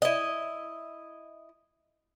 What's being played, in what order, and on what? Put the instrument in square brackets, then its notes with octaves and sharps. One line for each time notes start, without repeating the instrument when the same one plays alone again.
[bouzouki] E4 D#5